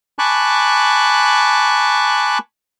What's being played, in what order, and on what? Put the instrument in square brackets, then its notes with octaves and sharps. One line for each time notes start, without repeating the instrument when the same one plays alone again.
[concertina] G#5 A5 B5 C#6 D6 F#6